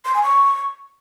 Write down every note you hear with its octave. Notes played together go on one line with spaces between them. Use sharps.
C6
G#5
C#6